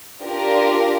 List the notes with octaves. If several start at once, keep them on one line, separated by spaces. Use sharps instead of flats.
D4 F4 G4 A#4